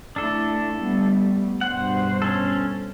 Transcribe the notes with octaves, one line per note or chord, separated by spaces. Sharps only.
A3 D4 E4 A4
G3 A3 B3
G2 B2 C5 F#5
C#4 A4